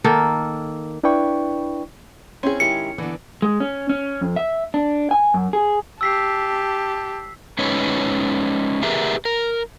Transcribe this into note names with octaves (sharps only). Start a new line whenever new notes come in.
D#3 A#3 A4
D4 E4 B4 D5 G5 C#6
C4 C#4 E4 G#4 C6
D#3 G#3 E4 G4 C#7
D3 E3 B3
G#3
C#4
C#4
F2
E5
D4
G#5
F#2
G#4
G4 A5 E6 B6 C7
G#3 C#4 D#4 B4 C#5
G4 G#4 A#4 B4 E5
A#4